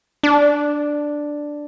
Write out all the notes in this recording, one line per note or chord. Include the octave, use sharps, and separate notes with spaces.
D4